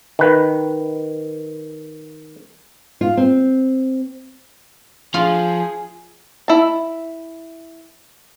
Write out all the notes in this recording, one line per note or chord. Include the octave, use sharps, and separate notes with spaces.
D#3 B4
F4
C4
F3 F4 G#4
E4 A5